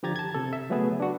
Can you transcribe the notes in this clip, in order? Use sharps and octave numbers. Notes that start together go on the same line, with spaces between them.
D3 F3 G4 A#5 G#6 A6
A5 G#6
C3 A4
E5
C#3 F#3 A3 B3 G#4 B4
D4 F#4